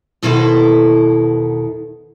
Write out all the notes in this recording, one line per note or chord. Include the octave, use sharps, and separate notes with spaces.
E2 B2 D#3 E4 A4 C5